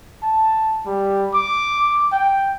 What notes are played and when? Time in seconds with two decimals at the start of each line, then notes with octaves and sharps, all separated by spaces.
0.23 A5
0.86 G3
1.34 D6
2.12 G5